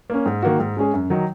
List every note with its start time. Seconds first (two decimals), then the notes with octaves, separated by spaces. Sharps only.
0.10 A#3 C#4
0.26 G#2
0.42 D#3 A#3 F#4
0.59 G#2
0.77 G#3 C#4 G#4
0.94 F#2
1.10 D#3 F#3 D#4